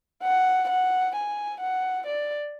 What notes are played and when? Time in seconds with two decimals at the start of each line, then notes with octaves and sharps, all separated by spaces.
0.23 F#5
0.69 F#5
1.15 G#5
1.61 F#5
2.07 D5